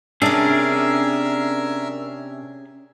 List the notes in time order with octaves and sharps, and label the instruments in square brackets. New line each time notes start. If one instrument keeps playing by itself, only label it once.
[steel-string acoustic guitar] C3 D4 [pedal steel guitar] C#4 G#4 [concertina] A#4 E5 E6